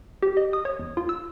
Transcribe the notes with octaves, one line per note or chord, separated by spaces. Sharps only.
G4
D#5
D#6
C#5
E2
F4
E6